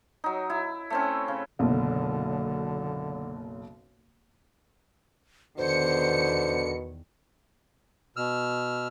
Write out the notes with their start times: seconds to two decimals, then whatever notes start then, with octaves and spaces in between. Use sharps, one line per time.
0.24 F#3 D#4
0.50 E4
0.90 A3 C4 C#4
1.28 C#3
1.59 F#1 B1 D3
5.58 E2 B2 D3 D#3 C5 C#7
8.16 B2 E6 F6